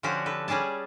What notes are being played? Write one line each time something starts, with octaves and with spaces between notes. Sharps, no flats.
D3 F3 C#4 D4 F#4 G4
A4 B4
G3 C#4 G#4 D5 A5